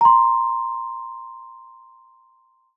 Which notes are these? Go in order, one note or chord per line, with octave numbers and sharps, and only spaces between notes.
A#5 C6